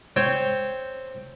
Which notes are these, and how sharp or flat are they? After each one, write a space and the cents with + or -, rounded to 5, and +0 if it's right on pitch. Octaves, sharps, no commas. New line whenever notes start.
C4 +0 C#5 +0 G5 +0